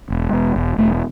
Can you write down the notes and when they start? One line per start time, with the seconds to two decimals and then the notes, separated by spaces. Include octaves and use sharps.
0.10 E1
0.33 E1
0.56 E1
0.78 E1 A3